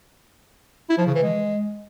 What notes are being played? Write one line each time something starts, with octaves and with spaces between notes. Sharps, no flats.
E4
F3
C#3
E3
G#3